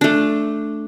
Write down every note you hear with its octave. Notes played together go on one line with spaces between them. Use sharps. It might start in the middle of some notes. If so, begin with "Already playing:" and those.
A3 D4